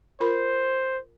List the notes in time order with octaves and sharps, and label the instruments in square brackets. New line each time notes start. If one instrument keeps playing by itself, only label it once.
[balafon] F4 A#4 B5 [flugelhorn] C5